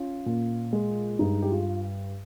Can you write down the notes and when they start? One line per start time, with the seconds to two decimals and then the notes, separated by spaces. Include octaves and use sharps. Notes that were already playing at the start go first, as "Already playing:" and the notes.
Already playing: C#4 F4
0.26 A#2
0.73 G#3
1.19 G2 D#4
1.42 G4
1.51 F4